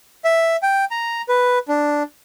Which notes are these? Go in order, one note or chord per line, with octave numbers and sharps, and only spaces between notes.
E5
G5
A#5
B4
D4